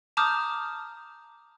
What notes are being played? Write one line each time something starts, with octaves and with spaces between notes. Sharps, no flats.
A5 A#5 D6 D#6 F6 G6